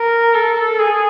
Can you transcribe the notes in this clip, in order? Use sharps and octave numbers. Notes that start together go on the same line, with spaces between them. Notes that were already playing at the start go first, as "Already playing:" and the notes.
Already playing: A#4
A4
G#4